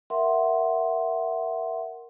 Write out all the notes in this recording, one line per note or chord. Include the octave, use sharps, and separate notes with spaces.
A#4 E5 F#5 C6